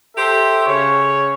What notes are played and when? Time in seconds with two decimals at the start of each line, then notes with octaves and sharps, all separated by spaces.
0.16 G4 A4 C5 E5
0.66 C#3 C#5